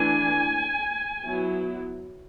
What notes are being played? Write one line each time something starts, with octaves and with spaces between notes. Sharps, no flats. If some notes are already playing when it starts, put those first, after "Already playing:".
Already playing: E3 A3 D4 G#5
F#3 B3 E4